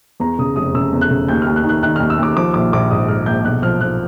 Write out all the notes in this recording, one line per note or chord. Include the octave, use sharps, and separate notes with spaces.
E2 A#5
C#3 D#6
F1 D#6
C#3 E6
E2
F#6
C#3
D#2 G6
D#2 F6
F#6
D#3
F#6
D#3 F#6
D#2 F6
E6
D#2 D6
F3 D6
A#1 D6
A#1 D6
G#2 D#6
G#2 F6
A#1 G6
B1 F#6
F3 F6
F3 F#6